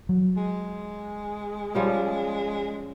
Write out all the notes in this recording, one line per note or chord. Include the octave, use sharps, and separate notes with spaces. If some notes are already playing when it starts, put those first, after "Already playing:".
F#3
G#3
F3 G3 C#4